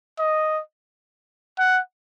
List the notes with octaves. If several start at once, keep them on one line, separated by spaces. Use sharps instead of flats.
D#5
F#5